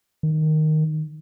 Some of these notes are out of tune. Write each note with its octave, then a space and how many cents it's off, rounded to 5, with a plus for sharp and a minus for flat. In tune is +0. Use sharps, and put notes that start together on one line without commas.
D#3 -5